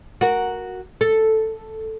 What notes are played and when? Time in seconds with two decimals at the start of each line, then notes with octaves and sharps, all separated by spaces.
0.21 F#4 A#4
1.01 A4